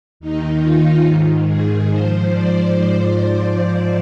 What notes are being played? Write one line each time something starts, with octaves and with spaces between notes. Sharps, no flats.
D#2 D#3 D#4
F4
G#2 D#3
G#4
G#2 F3 C5
D5